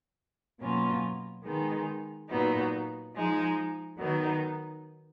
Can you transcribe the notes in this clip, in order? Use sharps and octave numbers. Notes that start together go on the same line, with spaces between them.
B2 F#3 A#3 C#4 F4
D#3 G#3 B3 D#4
A#2 F#3 B3 D#4
F3 G#3 D#4
D#3 F#3 B3 D#4